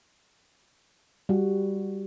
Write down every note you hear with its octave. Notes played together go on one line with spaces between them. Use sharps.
G3 F#4